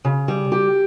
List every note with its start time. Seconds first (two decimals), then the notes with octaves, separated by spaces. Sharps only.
0.05 C#3
0.28 G3
0.52 G4